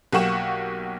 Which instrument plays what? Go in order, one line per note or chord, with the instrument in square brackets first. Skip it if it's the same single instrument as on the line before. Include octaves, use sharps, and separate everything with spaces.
[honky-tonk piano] B1 A#3 G4 F#5 C#6 E7